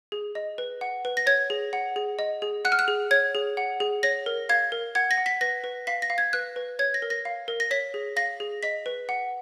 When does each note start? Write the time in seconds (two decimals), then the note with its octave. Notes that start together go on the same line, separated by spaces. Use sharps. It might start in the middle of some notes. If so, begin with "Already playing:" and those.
0.12 G#4
0.35 D#5
0.58 B4
0.81 F#5
1.05 B4
1.17 A#6
1.27 C#5 G#6
1.50 G#4
1.73 F#5
1.96 G#4
2.19 D#5
2.42 G#4
2.65 F#5 F#6
2.72 F6
2.79 F#6
2.88 G#4
3.11 C#5 G#6
3.35 G#4
3.57 F#5
3.80 G#4
4.03 C#5 A#6
4.26 A#4
4.49 F5 G#6
4.72 A#4
4.95 F#5 G#6
5.11 A#6
5.18 F#5
5.26 B6
5.41 B4 A#6
5.64 B4
5.87 F5 B6
6.02 A#6
6.10 F5
6.18 G#6
6.33 B4 F#6
6.56 B4
6.79 C#5 G#6
6.94 A#6
7.02 A#4
7.10 A#6
7.25 F5
7.48 A#4
7.60 A#6
7.71 C#5 B6
7.94 G#4
8.16 F5 A#6
8.40 G#4
8.63 D#5 B6
8.86 B4
9.09 F#5